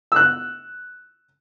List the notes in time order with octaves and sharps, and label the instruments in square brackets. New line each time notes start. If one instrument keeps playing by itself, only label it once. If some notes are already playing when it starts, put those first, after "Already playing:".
[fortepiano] E6 F#6